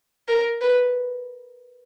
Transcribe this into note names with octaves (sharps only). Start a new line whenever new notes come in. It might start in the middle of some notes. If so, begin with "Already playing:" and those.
A#4
B4